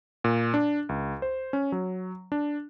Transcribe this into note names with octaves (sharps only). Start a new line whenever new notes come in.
A#2
D4
C#2
C5
C#4
F#3
D4